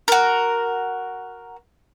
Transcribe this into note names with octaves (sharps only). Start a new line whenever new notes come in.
F#4 A#4